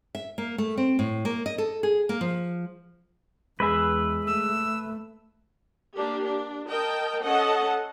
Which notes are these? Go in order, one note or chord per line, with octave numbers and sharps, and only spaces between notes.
E5
A#3
A3
C4
A2
A#3
D#5
A4
G#4
A#3
F3
E2 G#3 G#4 B4 E5
A3 E6
A#3 D4 G4
D4
A#4 D#5 G5 A5
C#4 A4 D#5 F#5 A5